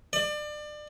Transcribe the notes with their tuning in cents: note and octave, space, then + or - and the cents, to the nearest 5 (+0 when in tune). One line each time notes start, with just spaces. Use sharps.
D5 +30